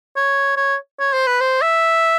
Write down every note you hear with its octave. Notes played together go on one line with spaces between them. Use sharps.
C#5
C#5
C#5
C5
B4
C5
E5